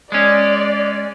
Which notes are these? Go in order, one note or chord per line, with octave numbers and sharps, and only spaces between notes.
G#3 C#4 D5